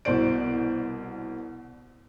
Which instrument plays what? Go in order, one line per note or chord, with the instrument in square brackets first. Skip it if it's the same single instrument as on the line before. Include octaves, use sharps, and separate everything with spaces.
[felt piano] C2 B2 C5 D5 D7